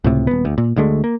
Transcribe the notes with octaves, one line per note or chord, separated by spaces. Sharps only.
C#2 A2 C3
D#1 B3
D2
A#2
D2 D3 G#3 A3
A#3